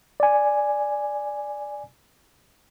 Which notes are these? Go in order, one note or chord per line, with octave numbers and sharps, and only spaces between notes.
D5 G#5